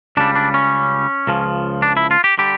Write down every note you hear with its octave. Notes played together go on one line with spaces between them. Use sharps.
C#2 C#3 G3 D4
D4
C#4
C#2 C#3 F3
D4
E4
F4
G4
D3 G3 G4